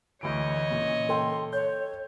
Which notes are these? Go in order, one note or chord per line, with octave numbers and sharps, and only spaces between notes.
D2 E3 C#5 D#5 D7
A#2 C#3 E3
A4 G5 C6
C#5 G6